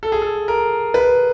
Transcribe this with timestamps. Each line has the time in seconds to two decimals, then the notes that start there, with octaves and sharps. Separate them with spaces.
0.03 A4
0.12 G#4
0.22 A4
0.48 A#4
0.94 B4